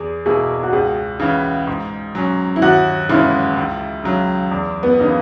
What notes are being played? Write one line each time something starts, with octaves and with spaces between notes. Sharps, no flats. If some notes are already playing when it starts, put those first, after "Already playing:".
Already playing: E2 G#4
B2 A#3 E4 G#4
F#4
C#2 G#4
C#3 E3
G#2
F#3 C#4
E4
D#2 F#4
C#3 E3 G#3 E4
C#2
C#3 F#3
E2
B3
C#3 E3 A#3 D#4